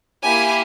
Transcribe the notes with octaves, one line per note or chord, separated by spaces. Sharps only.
A#3 E4 G4 G#5